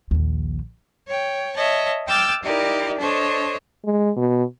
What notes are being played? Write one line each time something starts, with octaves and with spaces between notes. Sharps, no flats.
A#1 D#2
C#5 G5
C#5 D#5 E5 A5
G5 D6 E6 F6 G6 A6
D#4 E4 G4 A#4 D5
D4 A4 C5 C#5 D#5
G#3
B2